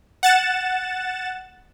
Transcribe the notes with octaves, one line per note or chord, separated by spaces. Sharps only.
F#5 A6 E7